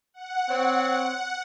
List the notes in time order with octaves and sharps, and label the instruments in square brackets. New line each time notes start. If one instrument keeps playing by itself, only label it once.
[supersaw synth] F#5
[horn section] C4 C#5